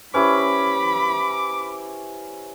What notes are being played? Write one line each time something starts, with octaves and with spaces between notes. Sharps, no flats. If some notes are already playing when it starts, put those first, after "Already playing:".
C#4 E4 G4 B4 C5 B5 D6